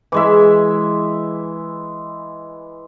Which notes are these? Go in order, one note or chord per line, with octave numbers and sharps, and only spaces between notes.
E3 G#3 E5